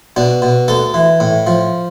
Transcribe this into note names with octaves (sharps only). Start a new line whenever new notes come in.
B2 D4
B2
D2 A4
E3
A2
F3